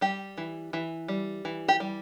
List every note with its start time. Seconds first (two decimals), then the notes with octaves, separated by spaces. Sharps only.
0.01 G3 G4
0.38 E3
0.73 E3
1.08 G3
1.45 E3
1.68 G4
1.80 G3